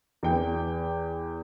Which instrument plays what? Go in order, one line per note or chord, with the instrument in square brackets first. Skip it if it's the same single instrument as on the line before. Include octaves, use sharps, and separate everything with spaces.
[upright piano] E2 G5